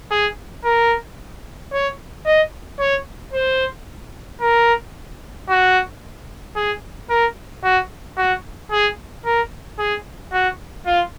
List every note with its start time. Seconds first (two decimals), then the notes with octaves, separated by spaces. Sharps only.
0.11 G#4
0.65 A#4
1.73 C#5
2.26 D#5
2.80 C#5
3.33 C5
4.41 A#4
5.49 F#4
6.56 G#4
7.10 A#4
7.64 F#4
8.17 F#4
8.72 G#4
9.25 A#4
9.79 G#4
10.33 F#4
10.86 F4